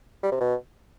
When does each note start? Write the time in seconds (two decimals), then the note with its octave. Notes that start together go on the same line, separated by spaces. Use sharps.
0.23 G3
0.32 C3
0.41 B2